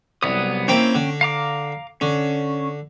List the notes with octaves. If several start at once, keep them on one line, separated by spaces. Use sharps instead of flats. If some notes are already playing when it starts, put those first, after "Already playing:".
C2 F#3 B3 D#6
A#3 C4 C#4 E4 G5
D3
F5 A#5 D6
D3 C#4